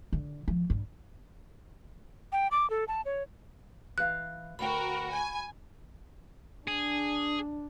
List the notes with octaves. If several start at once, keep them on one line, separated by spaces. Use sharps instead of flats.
D3
F3
G2
G5
D6
A4
A5
C#5
E3 F5 F#6
D2 F#4 A#4 G5 B5
G#5
D4 G#4